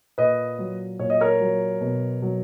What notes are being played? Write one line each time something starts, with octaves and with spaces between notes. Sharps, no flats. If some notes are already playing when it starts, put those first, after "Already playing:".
A#2 B4 D#5
F#3
A#2 C#5
D#5
A#4 C#5
F#3
B2
F#3